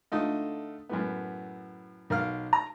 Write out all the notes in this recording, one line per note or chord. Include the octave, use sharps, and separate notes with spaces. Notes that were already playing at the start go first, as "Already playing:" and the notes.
D3 A3 D#4 F4
F#2 A2 B3
B1 A#4 F5 F6
A#5